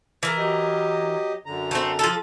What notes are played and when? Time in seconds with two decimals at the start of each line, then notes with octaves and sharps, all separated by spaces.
0.23 E3 A#4
0.38 F#3 G4 D#5
1.46 F#2 D3 A#5
1.71 A3 C4
1.99 F3 A4